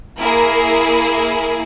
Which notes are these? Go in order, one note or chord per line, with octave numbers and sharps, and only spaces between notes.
A#3 E4 G#4 A#4
A#4